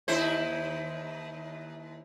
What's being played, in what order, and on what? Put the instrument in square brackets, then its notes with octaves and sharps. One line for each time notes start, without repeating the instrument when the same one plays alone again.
[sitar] D#2 E4 C5